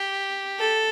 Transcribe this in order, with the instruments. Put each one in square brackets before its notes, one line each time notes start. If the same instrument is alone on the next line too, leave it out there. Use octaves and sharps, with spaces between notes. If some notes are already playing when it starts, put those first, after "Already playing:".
Already playing: [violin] G4
A4